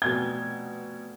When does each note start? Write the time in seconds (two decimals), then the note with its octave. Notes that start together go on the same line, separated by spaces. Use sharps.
0.02 F1 B2 G#6 G7